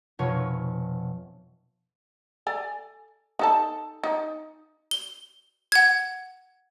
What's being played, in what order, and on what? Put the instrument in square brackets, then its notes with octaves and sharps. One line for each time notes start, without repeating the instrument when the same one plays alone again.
[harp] F1 B2 F4 C#5
[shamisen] A4 D5 G#5
D#4 A4 A5
D#4
[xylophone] G7
F#5 G#6